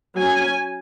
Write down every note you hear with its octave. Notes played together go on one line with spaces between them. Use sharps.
F#3 C#4 G#5